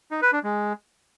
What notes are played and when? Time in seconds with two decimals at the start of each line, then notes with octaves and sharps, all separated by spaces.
0.11 D#4
0.22 B4
0.33 D4
0.44 G#3